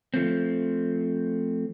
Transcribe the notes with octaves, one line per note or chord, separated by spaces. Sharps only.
F3 A3 C4